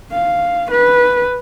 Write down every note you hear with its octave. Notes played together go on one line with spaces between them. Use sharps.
F5
B4